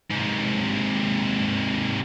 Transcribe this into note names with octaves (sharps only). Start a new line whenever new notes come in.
G#2 C3